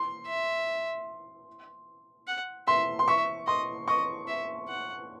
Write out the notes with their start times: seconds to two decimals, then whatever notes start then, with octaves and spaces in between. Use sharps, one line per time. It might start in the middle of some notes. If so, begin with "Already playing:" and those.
Already playing: C6
0.27 E5
2.27 F#5
2.67 E5 C6
2.99 C6
3.08 E5 C#6
3.47 D#5 C6
3.88 D#5 C#6
4.28 E5
4.68 F#5